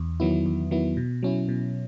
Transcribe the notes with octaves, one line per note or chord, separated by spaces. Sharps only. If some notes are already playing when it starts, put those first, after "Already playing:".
Already playing: E2
D#3 F#3 B3 E4
E2
D#3 F#3 B3 E4
B2
F#3 C#4 E4
B2